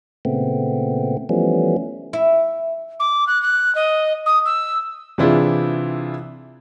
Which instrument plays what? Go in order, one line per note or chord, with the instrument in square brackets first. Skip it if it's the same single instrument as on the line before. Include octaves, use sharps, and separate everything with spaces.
[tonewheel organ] A#2 C#3 A3 B3 C4
E3 F3 G3 A3 B3 C#4
[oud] E4
[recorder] D6
F#6
F#6
D#5
D#6
E6
[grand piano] C3 E3 D4 E4 F4 G#4